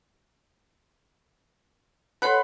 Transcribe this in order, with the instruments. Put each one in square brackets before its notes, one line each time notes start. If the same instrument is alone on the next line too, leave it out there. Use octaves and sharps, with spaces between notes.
[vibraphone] A4 C#5 F#5 [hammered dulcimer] B4 C6